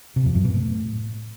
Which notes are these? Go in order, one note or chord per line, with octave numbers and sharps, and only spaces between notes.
C3
F2
F#2
B2
A2